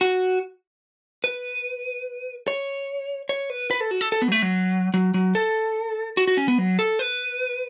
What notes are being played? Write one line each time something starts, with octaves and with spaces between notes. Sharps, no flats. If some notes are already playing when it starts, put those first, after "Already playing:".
F#4
B4
C#5
C#5
B4
B4
A4
F#4
A4
A4
B3
F#3
A3
F#3
F#3
F#3
A4
F#4
F#4
C#4
B3
F#3
A4
B4